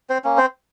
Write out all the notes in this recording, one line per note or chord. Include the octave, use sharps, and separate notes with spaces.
C4 C5
A#3 C#4
C4 C5